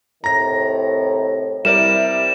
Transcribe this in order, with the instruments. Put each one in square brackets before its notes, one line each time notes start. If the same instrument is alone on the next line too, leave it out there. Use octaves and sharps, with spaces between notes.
[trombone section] A2 C3 D#3 [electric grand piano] A#5 A#6
[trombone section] C3 E4 [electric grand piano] G3 A#4 D5 [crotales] E7